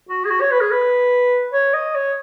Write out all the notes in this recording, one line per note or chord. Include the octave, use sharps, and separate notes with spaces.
F#4
G#4
F#4
C#5
B4
G#4
B4
C#5
D#5
C#5